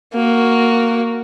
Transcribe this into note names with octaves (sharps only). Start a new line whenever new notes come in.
A#3 F#4